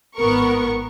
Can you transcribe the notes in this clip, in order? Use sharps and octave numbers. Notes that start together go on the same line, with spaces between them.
G#1 B3 A#4 C#6